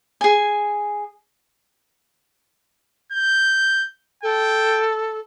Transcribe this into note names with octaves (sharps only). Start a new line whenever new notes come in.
G#4 G#5
G6
A4 G5